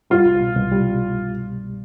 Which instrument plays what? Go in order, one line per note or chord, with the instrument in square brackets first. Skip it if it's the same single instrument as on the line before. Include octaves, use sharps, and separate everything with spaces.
[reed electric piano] G3 [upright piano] F4
[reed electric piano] C2
B2
C2
G3